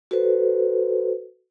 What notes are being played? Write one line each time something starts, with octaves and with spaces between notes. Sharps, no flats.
F#4 A4 B4 C5